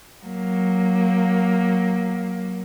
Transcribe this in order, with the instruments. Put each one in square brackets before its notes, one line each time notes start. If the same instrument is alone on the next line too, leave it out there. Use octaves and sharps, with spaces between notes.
[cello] F#3 A#3